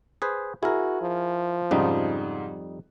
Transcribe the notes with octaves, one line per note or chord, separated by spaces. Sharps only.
G#4 B4 C5
E4 F#4 G#4 A#4
F3
F2 G#2 C#3 G3 D#4